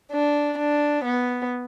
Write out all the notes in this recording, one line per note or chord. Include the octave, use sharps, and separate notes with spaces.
D4
D4
B3